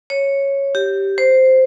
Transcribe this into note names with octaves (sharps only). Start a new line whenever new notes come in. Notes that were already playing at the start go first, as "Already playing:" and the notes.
C#5
G4
C5